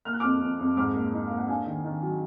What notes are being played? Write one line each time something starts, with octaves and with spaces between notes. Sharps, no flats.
A#3 F6
F#6
F2 D6 F6
F2
F2
G#2 D6 F6
A#3
D#4
A#3 F5
F#5
D4 F5 G#5
D#3
D#3
F#3